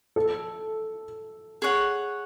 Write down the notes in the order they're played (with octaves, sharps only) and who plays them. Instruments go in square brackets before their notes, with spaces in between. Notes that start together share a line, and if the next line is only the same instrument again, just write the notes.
[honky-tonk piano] A4
[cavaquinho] G#4 C#5 F#5